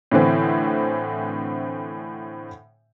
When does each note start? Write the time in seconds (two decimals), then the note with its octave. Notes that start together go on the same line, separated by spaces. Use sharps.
0.11 A2 D3 E3 C4